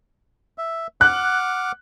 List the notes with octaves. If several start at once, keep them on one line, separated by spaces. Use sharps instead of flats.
E5
F#5 D6 F6 F#6